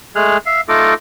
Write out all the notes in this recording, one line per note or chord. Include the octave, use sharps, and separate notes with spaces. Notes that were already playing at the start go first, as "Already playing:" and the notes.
G#3 A3 G#4 F6 F#6
E5 F5
A3 D#4 F4 A4 D6